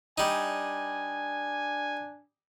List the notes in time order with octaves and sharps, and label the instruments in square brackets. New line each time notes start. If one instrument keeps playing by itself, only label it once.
[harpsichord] G3 D#4 [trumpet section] D4 G#5